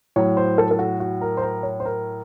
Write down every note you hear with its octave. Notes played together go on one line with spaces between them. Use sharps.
A2 F#3 C#5
C5
A4
A4
F#4
F#4
A#4
C5
A#4
C#5
C5
A#4